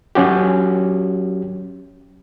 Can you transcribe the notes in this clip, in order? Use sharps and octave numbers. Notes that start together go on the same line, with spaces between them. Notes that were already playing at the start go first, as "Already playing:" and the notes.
F#3 C#4 F#4 G4